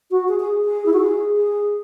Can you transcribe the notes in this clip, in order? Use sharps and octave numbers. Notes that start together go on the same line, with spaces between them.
F#4
G#4
G#4
G#4
E4
F#4
G#4
G#4